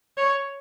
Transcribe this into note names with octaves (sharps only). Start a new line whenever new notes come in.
C#5